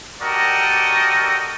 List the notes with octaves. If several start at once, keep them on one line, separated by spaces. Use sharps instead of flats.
F#4 G4 A4 A#4 D5 D#5